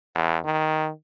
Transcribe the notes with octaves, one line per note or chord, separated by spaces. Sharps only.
E2
D#3